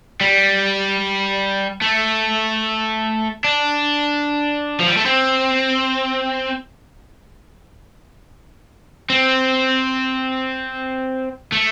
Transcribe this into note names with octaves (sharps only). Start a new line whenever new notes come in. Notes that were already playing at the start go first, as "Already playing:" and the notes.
G3
A3
D4
F3
G3
A3
C4
C4
A3